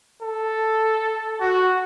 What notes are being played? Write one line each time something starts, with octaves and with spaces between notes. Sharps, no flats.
A4
F#4